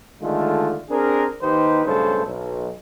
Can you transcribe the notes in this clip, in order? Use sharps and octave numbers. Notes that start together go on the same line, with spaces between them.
D3 D#3 G#3 A3 F4
C4 D4 G#4 A#4
D#2 D#3 D#4 G4 B4 C5
B1 G2 C#3 A3 A4 C5
B1